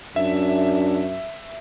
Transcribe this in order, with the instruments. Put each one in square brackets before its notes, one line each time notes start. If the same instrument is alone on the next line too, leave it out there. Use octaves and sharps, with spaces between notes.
[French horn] F#2 [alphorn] D4 [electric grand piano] E5